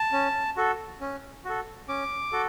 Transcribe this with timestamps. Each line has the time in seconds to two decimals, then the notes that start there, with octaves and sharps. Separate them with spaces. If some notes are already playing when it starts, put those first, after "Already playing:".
Already playing: A5
0.13 C#4
0.56 F#4 A4
1.01 C#4
1.45 F#4 A4
1.88 C#4 D6
2.32 F#4 A4